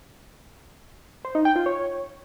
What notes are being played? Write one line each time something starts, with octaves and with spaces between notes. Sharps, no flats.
C5
D#4
G5
F4
C#5